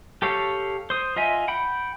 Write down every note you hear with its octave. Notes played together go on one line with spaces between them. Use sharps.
G4 A4 C#5 F5
C5 D#6
F4 D#5 E5 G#5
F#5 G5 B5